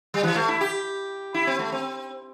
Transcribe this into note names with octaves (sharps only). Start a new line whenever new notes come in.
G3
E3
A3
E4
G4
E4
C4
A3
C4